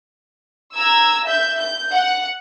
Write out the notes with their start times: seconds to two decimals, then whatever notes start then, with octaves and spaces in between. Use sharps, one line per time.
0.75 A#5 E6 G#6
1.25 E5 G6
1.59 G6
1.92 F#5